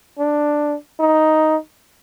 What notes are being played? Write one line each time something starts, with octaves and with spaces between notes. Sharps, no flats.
D4
D#4